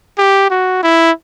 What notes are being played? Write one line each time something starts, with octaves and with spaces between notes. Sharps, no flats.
G4
F#4
E4